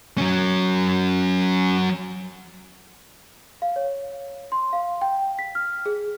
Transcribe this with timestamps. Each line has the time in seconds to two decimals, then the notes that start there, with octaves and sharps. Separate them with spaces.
0.18 F#3 C#4
3.62 F5
3.76 C#5
4.52 C6
4.73 F5
5.01 G5
5.39 B6
5.55 F6
5.86 G#4